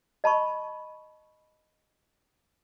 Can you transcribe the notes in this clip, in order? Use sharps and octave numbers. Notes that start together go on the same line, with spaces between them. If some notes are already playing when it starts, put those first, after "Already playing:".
D#5 A5 B5 C#6